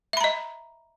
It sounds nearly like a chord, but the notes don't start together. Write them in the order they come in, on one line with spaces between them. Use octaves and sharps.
E5 B5 A#5 D#5